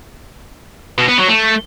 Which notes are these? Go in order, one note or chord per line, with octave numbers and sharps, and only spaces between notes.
B2
B3
F#3
A3